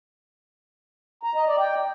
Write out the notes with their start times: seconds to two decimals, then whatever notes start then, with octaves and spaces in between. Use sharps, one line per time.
1.23 A#5
1.35 D#5
1.47 D5
1.59 G5